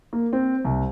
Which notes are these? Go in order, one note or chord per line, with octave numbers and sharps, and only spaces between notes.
A#3
C4
C2